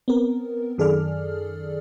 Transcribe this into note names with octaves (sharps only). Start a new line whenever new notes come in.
B3 C4 A#4
F#2 D#3 G#4 A4 D5 F6